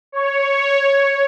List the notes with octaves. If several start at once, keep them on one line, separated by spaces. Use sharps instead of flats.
C#5